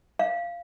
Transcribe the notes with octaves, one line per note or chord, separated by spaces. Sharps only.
F5